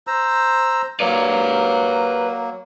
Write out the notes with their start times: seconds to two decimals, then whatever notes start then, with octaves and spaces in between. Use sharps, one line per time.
0.07 C5 A#5 E6
1.00 F#3 A#3 B4 D5